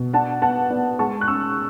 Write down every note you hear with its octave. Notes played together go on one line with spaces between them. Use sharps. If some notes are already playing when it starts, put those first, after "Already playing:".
Already playing: B2
D4 F#5 A5
B3 F#5 A5
B3 D5
G#3 A5 C#6
F#6
C#4 C#6 E6